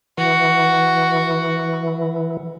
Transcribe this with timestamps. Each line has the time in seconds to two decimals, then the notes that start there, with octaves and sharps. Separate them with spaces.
0.18 E3 F#4